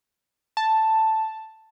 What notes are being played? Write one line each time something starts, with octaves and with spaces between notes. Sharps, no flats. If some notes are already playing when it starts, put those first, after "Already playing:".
A5